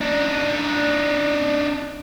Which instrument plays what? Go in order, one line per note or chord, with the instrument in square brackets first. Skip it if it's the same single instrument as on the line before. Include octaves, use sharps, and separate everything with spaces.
[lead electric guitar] D4 D#4